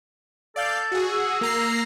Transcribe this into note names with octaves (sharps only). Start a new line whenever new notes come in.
A4 D5 F5 G6
F#4 G#4
E6
A#3 A#5 C7